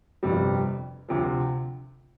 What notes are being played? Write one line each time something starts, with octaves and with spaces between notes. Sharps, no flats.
G1 F2 C3 G3
D2 C3 F3